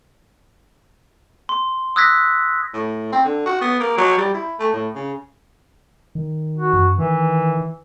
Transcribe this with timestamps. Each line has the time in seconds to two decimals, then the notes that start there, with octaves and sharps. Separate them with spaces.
1.49 C6
1.96 D#6 E6 F#6 G#6 A#6 B6
2.74 A2
3.12 C4
3.25 D3
3.46 F#4
3.61 B3
3.80 A#3
3.97 F#3
4.18 G3
4.34 E4
4.59 A3
4.73 A2
4.95 C#3
6.15 D#3
6.58 F#4
6.73 F#2
6.98 D#3 E3